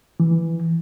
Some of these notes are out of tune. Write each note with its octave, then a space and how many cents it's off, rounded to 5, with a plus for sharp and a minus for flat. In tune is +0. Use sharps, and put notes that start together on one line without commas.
E3 +5